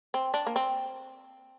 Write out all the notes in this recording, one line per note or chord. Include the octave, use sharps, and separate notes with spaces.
C4
D4
A#3
C4